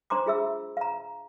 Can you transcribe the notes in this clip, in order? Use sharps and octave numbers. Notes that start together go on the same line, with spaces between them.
D4 C5 A#5 C6 D6
F4 G#4 E5 E6
F5 A#5